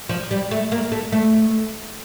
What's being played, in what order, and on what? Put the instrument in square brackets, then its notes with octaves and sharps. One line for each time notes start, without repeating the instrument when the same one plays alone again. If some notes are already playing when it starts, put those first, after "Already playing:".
[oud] F3
G3
A3
A#3
A3
A3